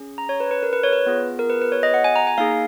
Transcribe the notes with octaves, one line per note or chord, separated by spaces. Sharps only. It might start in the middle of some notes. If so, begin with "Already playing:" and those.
Already playing: C#4 G#4
A#5
C#5
B4
B4
A#4
B4
C#5
B4
B3 F4 G#4
A#4
B4
B4
C#5
D#5
F#5
G#5
A#5
G#5
A#3 D#4 G#4 F5